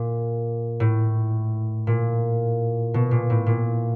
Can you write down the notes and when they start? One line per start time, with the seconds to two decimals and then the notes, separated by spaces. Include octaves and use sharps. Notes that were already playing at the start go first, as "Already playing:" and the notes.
Already playing: A#2
0.80 A2
1.87 A#2
2.94 B2
3.11 A#2
3.30 A2
3.46 A#2